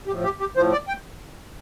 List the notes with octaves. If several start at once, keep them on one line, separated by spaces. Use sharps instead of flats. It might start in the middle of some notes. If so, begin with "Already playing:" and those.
A2 F3 G4
G4
G4
A2 F3 C5
D5
G5